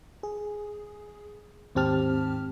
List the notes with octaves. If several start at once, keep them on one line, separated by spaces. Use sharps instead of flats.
G#4
D#2 G#2 C4 G4 A5 F6